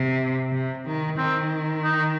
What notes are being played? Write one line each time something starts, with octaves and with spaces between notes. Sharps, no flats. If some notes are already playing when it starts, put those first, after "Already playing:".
Already playing: C3
C3
D#3
D#3 C4
D#4